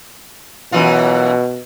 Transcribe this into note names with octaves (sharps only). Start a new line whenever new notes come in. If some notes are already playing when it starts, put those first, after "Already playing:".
F#2 B2 E3 F4